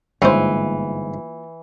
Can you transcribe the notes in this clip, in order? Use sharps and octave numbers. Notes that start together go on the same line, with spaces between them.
G1 G#2 C#3 E3 A#3 F4 C5